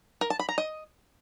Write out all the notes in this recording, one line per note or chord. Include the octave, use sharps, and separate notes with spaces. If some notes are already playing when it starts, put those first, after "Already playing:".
A#4
A5
B5
A#5
D#5